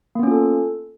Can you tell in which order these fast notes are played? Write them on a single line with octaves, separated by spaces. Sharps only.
A#3 B3 C#4 F4 A4